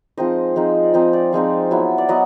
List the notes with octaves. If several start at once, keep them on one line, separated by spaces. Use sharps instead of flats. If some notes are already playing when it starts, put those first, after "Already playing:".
F3 G#3 C4 D#4 D#5
F3 G#3 C4 D#4
D5
F3 G#3 C4 D#4 D#5
D5
F3 G#3 C4 D#4
F#3 B3 E4
D5
F#3 B3 D#5